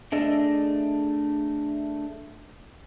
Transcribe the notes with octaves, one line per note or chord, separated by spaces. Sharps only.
A3 D4 G#4 D#5 E6